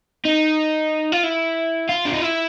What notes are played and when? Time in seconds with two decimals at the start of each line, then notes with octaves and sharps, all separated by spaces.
0.25 D#4
1.12 F4
1.24 E4
1.89 F4
2.05 D4
2.13 D#4
2.22 E4